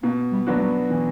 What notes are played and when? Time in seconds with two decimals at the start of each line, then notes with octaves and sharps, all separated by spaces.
0.03 B2 A#3
0.32 G3
0.47 F#3 B3 D4 F#4
0.56 A#3
0.61 G3
0.90 B2 E3